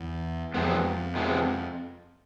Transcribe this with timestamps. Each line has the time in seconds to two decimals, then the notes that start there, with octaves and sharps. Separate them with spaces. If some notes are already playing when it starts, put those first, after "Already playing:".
Already playing: E2
0.54 F2 C3 F3 G#3 B3
1.15 C3 F3 G#3 B3